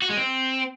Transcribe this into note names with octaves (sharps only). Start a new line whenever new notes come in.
F#4
G#3
C4